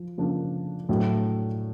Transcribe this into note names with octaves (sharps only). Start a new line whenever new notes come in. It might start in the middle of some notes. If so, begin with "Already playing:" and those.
Already playing: F3
C#3 F3 A#3 D4
A2 F#3 A3 D4